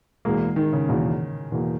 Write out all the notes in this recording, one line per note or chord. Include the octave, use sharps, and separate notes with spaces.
E2 B2 G#3 A#3
D#3
C#3
E2 B2 A#3
E2 B2 A#3